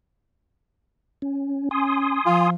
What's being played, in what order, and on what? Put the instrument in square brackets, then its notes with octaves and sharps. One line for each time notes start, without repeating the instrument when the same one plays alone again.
[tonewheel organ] C#4
[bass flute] C#4 [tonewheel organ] G#5 C6 D#6
[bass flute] F3 [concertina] F4